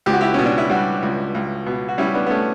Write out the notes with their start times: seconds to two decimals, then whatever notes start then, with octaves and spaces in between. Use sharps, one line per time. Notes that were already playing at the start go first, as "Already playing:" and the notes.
0.06 C#2 G4
0.13 F#4
0.21 E4 G4
0.34 B2 C#4
0.46 D4
0.58 E4
0.70 G3 D4 F#4
1.03 C#2
1.35 C#2
1.66 B2
1.88 F#4
1.98 G3 C#4 E4
2.14 B3 D4
2.26 B3
2.30 A3 C#4